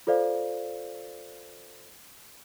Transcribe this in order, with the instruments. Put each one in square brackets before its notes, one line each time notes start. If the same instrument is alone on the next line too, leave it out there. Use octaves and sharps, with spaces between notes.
[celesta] F4 A4 C5 D5 F5